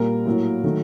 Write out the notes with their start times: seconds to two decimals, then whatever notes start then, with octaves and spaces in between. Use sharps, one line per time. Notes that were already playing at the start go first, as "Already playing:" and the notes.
Already playing: A#2 G3 A#3 A#4
0.25 A2 F#3 A#3
0.64 D#3 F#3 A3